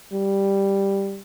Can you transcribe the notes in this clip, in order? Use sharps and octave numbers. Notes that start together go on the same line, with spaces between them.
G3